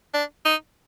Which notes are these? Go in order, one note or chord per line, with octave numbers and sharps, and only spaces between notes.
D4
D#4